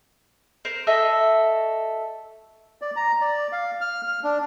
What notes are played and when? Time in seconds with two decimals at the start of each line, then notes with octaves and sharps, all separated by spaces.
0.65 A#4 C5
0.87 F#4 A4 D#5 E5
2.82 D5
2.96 A#5
3.21 D5
3.52 F5
3.81 F6
4.08 F6
4.24 D4